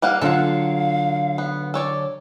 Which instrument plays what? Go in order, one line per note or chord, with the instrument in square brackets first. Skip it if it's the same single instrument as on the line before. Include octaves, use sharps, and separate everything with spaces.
[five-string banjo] G3 A#3 F#5 [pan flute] F5
[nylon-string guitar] D3 F#3 F4 [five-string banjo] A4 F#5 [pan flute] F5
[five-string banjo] B3
A4 C#5 D5